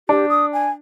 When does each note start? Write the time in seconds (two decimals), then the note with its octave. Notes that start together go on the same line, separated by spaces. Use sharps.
0.09 D4 G4
0.29 D#6
0.53 G#5